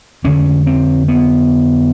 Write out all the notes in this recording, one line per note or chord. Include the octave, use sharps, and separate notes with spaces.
F2 D3 C#4
C4
B3